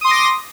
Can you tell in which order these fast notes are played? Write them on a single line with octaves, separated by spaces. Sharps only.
D#6 C6 D6 A#6